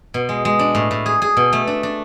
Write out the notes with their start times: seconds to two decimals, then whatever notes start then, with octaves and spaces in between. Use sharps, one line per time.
0.14 B2
0.29 G#3
0.45 G#3
0.59 D4
0.75 A2
0.91 A2
1.06 G#4
1.22 G#4
1.37 B2
1.53 A3
1.67 D4
1.83 D4